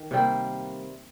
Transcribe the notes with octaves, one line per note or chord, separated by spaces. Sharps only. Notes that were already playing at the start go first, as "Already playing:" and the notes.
Already playing: D#3
C3 G3 A#3